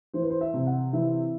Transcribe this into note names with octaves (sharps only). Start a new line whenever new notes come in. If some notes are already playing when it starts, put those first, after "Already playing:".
E3 C5
B4
C5
E5
C3
F#5
E3 E5